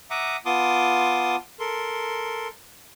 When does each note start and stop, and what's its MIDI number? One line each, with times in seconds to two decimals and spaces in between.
0.10 0.37 76
0.10 0.37 78
0.10 0.37 82
0.10 0.37 86
0.10 0.37 87
0.46 1.36 59
0.46 1.36 65
0.46 1.36 81
0.46 1.36 84
0.46 1.36 86
0.46 1.36 87
1.60 2.48 69
1.60 2.48 70
1.60 2.48 84